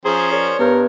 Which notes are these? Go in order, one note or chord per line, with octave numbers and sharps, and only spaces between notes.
F3 C#4 G#4 C5 A#5
A#4 C#5 D5
G2 B3 A#4 F6 G6